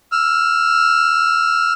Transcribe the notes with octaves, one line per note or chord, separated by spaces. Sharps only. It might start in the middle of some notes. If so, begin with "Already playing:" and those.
E6 F6